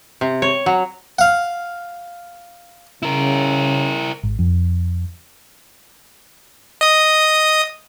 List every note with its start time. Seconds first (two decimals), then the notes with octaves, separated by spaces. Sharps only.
0.21 C3
0.42 C#5
0.66 F#3
1.19 F5 F#5
3.03 C#3 E4 A#4
4.23 G#1
4.39 F2
6.81 D#5 D#6